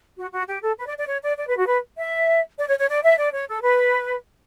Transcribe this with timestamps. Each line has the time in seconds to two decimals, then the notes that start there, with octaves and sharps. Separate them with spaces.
0.17 F#4
0.31 F#4
0.47 G4
0.62 A4
0.77 B4
0.87 D5
0.97 D5
1.07 C#5
1.22 D5
1.38 D5
1.47 B4
1.57 F#4
1.67 B4
1.97 E5
2.58 D5
2.68 C#5
2.79 C#5
2.89 D5
3.03 E5
3.18 D5
3.33 C#5
3.48 A4
3.63 B4